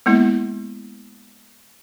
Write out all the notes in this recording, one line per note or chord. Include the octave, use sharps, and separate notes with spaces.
G#3 A#3 B3 E4